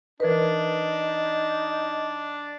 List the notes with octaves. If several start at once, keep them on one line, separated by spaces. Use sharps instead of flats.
E3 D4 D#4 A#4 B4